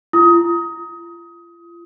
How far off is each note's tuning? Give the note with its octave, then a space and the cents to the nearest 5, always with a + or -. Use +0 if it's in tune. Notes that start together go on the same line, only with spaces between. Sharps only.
F4 -35 D#6 +20